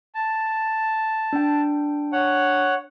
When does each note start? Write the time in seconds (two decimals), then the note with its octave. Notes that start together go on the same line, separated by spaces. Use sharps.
0.15 A5
1.33 D4 G5
2.13 C#5 F#5